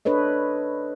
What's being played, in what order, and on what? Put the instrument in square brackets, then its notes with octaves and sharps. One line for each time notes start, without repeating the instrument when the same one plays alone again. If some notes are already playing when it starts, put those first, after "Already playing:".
[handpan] D4 A4 B4 C#5 D#5